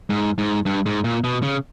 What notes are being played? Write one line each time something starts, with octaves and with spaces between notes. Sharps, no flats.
G#2
G#2
G2
G#2
A#2
B2
C#3